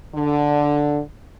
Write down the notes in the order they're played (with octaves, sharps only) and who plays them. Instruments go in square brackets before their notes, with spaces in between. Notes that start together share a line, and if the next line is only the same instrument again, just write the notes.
[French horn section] D3